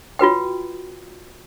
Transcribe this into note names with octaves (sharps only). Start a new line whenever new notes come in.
F4 F#4 B4 G5